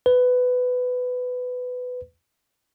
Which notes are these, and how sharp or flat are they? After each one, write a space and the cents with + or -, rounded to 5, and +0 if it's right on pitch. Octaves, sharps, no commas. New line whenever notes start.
B4 +15